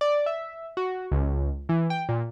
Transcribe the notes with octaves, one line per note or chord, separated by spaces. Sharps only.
D5
E5
F#4
C#2
E3
G5
A#2